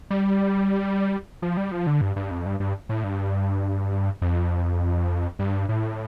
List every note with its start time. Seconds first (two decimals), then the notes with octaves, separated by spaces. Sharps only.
0.10 G3
1.42 F3
1.57 G3
1.72 F3
1.87 D3
2.01 G2
2.16 G2
2.31 F2
2.46 G2
2.60 G2
2.89 A2
3.04 G2
4.22 F2
5.39 G2
5.69 A2